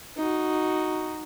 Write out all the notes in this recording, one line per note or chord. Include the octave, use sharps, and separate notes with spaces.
D#4 F#4